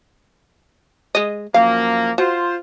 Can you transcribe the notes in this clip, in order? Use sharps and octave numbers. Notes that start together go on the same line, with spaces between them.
G#3 D#5
F#2 F3 A#3 F5
F4 F#4 C5